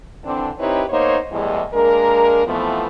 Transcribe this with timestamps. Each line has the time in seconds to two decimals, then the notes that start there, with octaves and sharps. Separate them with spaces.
0.25 D3 E3 C4 D4
0.59 C4 D#4 E4 G4 B4 C#5
0.89 A#3 B3 D#4 C5 C#5
1.31 E2 A2 E3 G3 G#3 D#5
1.74 G#3 A#3 D4 A#4
2.47 F2 E3 F3 A3 B3